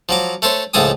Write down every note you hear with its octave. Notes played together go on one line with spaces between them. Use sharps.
F3 F#3 D6
A3 A4 C5 C#5
C#2 A2 F3 A4 G#5 D#6